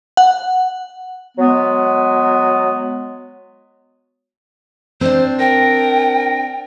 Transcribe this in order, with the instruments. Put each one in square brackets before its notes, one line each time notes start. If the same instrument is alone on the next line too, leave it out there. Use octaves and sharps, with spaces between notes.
[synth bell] F#5
[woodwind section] F#3 G#3 B3
[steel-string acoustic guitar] C4 D4 [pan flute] C5
[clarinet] A#4 [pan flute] G5